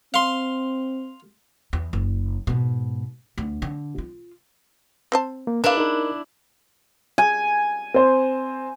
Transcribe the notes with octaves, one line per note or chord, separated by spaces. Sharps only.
C4 F5 C6
E2
F#1
G#2 B2
D2
D3
F4
C4 C5 A5
A#3
D4 E4 A#4 B4 E5 F5
D#4 A#4
G#5
C4 C5